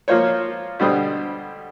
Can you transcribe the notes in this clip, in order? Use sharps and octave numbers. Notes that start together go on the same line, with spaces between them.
F3 A#3 F4 C5 C#5
B2 D3 G3 C5 D#6